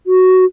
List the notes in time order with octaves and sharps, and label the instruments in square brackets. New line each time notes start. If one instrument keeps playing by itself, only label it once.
[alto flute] F#4